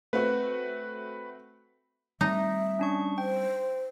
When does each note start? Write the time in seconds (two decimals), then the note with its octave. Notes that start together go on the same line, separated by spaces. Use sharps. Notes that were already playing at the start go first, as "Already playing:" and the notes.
0.13 A3 C4 F#4 B4
2.21 G3 A3 C4 D#4 E5
2.79 C#4 D4 C#6
3.18 C5 G5